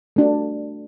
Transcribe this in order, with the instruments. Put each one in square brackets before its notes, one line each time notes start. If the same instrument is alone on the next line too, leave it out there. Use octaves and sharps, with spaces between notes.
[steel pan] A3 D4 F#4